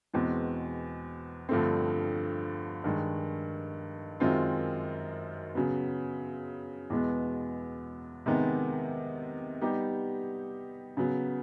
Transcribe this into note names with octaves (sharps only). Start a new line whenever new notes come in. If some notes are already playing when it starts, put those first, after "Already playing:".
E2 B2 G#3 C4
G2 D3 F3 A3 C4
G2 D#3 G#3
F#2 D#3 G#3 C4 F4
C#3 F#3 B3
E2 B2 G#3 B3
C3 D#3 G#3 B3 D#4
G3 B3 D#4 G4
C#3 F#3 B3